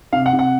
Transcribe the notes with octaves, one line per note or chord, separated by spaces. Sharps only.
C3 F5
F#5
C3
F#5